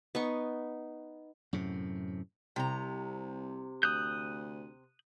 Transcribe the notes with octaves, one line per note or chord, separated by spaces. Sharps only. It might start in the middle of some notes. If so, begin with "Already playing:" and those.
B3 D#4 C#6
F#2 A2 C3
C2 C3 A#5
D2 D#6 F#6 G6